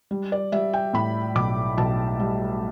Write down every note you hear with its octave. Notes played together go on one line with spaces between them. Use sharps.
G3
D5
G3 E5
G5
A2 B5
B1 D6
B1 A5
G3